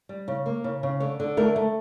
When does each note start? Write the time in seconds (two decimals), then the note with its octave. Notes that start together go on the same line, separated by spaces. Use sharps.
0.09 G3
0.28 C#3
0.46 A#3
0.64 C#3
0.83 C#3
1.00 D3 C#5
1.20 D3
1.37 A3 A#4
1.56 A3